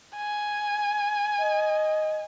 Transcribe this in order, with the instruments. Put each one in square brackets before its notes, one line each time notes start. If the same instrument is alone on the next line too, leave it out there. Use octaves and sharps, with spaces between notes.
[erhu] G#5
[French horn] D#5